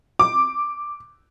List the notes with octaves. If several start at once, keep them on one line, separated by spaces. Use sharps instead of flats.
D6